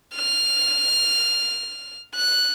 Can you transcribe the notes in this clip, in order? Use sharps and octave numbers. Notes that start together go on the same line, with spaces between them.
F6
F#6